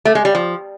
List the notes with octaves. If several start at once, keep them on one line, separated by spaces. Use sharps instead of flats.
A3
G#3
G3
F3